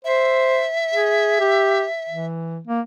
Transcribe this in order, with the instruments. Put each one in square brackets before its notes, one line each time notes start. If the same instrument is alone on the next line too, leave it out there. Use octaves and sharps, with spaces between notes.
[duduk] C5 [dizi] E5
[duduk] G#4
G4
E3
A#3